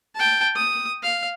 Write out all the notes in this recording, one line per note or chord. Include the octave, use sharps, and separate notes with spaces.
G5 A5
D#6
F5